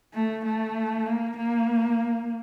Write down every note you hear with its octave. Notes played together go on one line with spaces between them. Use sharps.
A3
A3
A#3
A#3